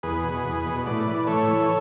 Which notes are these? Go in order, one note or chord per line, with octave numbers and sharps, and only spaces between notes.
E2 G#4 B4
B2
E2
B2
A2 B4 D5
E3
A2 A4 C#5
E3